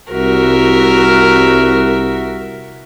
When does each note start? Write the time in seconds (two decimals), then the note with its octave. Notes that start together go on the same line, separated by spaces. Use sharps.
0.11 C2 F#4 A#4 E5